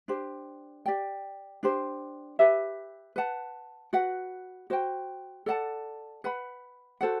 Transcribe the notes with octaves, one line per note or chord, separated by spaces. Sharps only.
D4 G4 C5
G4 D5 G5
D4 G4 C5
G4 B4 E5
B4 F#5 A5
F#4 B4 F#5
F#4 C5 G5
A4 D5 F#5 A5
B4 F#5 B5
F#4 A4 C5 F#5